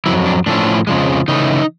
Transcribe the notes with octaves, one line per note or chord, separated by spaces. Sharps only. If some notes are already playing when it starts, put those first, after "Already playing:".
F2 C#3 F#3 E4
D4
A2 F3 A3 C#4 D4
F2 C#3 F3 G#3
C#3 E3 A3 D#4